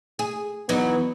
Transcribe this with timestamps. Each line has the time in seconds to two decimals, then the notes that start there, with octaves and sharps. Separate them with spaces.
0.19 G#4
0.69 E3 F#3 B3 D#4